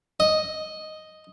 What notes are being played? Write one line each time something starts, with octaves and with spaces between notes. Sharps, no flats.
D#5